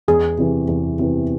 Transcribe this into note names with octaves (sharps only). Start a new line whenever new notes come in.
E2 G#4
C3 E3
E2
C3 E3